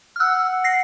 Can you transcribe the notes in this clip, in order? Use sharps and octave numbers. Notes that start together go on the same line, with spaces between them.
F6
F#5 E6 F#6
A#6 C7